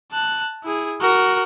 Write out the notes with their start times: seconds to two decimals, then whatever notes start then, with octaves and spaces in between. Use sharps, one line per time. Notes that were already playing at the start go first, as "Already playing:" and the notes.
0.12 A5 F#6
0.64 E4 G#4
1.01 F#4 A#4